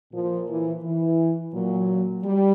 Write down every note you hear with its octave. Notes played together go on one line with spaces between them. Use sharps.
A#2 F3
E3
E3
A#2 F#3
G3